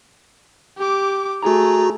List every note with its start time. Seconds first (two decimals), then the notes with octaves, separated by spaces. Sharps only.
0.77 G4 D6
1.43 A3 F#4 G#4 A#5